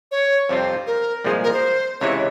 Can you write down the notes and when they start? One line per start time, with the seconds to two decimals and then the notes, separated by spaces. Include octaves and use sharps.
0.11 C#5
0.49 F2 C3 G3 C4 F4 C5
0.87 A#4
1.24 C2 A#2 F3 G#3 G#4
1.44 A#4
1.53 C5
2.00 C#2 C3 E3 G#3 E4 C#5